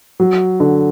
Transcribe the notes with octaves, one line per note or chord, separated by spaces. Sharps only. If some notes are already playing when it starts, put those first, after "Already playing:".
F#3
D3